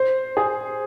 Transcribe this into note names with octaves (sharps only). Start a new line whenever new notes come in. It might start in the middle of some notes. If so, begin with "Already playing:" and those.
Already playing: C5
G#4